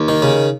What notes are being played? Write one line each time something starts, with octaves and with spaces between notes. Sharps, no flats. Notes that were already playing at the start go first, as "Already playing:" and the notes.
Already playing: D#2
D#3
C#3